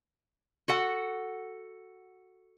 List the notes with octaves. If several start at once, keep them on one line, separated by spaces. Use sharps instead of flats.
F#4 A4 F#5